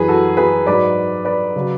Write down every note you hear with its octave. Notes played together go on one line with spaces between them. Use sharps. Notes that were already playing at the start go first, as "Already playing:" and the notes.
Already playing: F#2 E3 G#4 B4
F#4 A4
G#4 B4
G#2 F#3 B4 D5
B4 D5
C#3 F#3